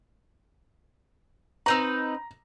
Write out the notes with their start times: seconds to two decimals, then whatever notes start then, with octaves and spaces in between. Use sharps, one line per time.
1.66 C4 D#4 B4 A#5